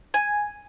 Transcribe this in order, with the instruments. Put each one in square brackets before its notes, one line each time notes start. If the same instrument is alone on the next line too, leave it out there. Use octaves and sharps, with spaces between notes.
[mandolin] G#5